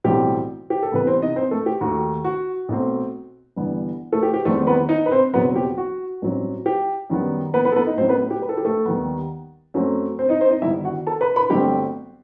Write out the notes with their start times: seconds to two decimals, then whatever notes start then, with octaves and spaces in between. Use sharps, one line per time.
0.04 B1 A2 E3 G3 C4 G4
0.70 G4
0.83 A4
0.92 C2 C3 E3 G3 B3 B4
1.07 C4 C5
1.22 D#4 D#5
1.36 C4 C5
1.51 A3 A4
1.66 G4
1.81 D#2 D#3 A3 F#4
2.24 F#4
2.69 B1 B2 A3 C4
3.56 G1 G2 E3 G3 B3
4.12 A3 A4
4.23 G4
4.34 G4
4.45 E2 D#3 G3 A3 C4 A4
4.67 B3 B4
4.89 D#4 D#5
5.06 B4
5.11 C4 C5
5.33 F#1 E2 B2 F#3 B3 C4 B4
5.56 G4
5.78 F#4
6.22 A1 G2 F#3 C4
6.66 G4
7.10 F#2 D#3 G3 B3
7.54 B3 B4
7.65 B3 B4
7.72 A4
7.76 B3 B4
7.87 D#4 D#5
7.97 A1 A2 F#3 C4 C5
8.09 B3 B4
8.30 G4
8.42 B4
8.49 A4
8.57 G4
8.65 A3 A4
8.85 D#2 D#3 G3 B3
9.74 F#2 F#3 A3 C4
10.19 C4 C5
10.29 D#4 D#5
10.40 C4 C5
10.51 D#4 D#5
10.62 G1 G2 D#3 E4 E5
10.84 F#4 F#5
11.07 A4 A5
11.21 B4 B5
11.36 B4 B5
11.50 G1 G2 F#3 A3 C4 G4 G5